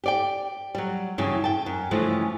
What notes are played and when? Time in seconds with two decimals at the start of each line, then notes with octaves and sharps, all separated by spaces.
0.04 G4 D5 G5
0.75 F#3 G3
1.18 G2 C#3 E3 F#3
1.44 G5 A5
1.66 F#2
1.91 G2 C#3 E3 F3 G#3 A3